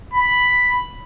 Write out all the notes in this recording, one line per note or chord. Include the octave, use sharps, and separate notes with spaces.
B5